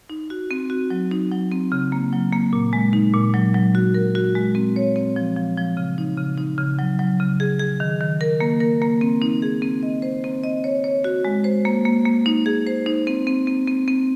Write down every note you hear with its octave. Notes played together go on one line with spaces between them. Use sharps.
D#4
F#4
C4
F#4
F#3
D#4
F#3
C4
C#3
A#3
F#3
A#3
A#2
G#3
D#4
A#2
F#3
F#3
F#4
A#4
F#4
G#3
C4
C#5
C4
F3
F3
F3
C#3
D#4
C#3
D#4
C#3
F#3
F#3
C#3
G#4
G#4
D#3
D#3
A#4
A#3
A#4
A#3
C4
D#4
G#4
C4
D#5
C5
C4
D#5
C#5
C#5
F#4
G#3
C5
A#3
A#3
A#3
D#4
G#4
C5
D#4
C4
C4
C4
C4
C4